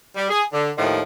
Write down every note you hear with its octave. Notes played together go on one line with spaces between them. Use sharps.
G3
G#4
D3
D#2 A2 D#3 F3